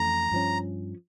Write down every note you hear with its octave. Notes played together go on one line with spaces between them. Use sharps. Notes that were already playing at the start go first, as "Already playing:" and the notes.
Already playing: F2 E3 A3 C#4 A#5
G2 F3 C#4